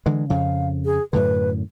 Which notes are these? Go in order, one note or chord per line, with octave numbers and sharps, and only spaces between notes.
D3 E3 G#3
F2 C#3 F5
G#4
F#2 A2 D3 B4